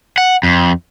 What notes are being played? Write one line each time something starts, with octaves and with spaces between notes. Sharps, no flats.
F#5
F2